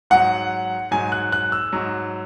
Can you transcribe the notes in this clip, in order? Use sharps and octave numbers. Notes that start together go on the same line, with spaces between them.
G#2 F#3 F#5
G#2 F#3 G#5
F#6
F#6
E6
G#2 F#3